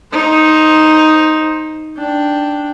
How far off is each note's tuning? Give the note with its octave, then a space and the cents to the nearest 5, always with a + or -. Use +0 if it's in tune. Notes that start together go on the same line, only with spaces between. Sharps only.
D#4 +0 C5 +10
D4 +0 G5 +0